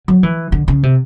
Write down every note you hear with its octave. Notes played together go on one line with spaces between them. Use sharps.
F#3
E3
D3
C#3
C3